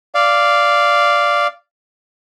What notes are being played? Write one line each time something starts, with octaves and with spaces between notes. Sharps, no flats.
D5 F5